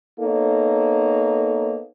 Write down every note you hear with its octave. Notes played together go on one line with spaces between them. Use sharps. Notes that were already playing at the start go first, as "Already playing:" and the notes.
A#3 B3 D#4 A4 C#5